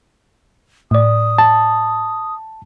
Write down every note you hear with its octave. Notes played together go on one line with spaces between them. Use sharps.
A2 D5 D#6
A5